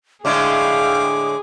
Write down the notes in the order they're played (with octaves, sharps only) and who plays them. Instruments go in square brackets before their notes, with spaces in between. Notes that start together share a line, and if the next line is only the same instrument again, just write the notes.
[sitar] A2 D3 G#3 [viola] G#4 [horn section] E5 F5 G5 [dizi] D6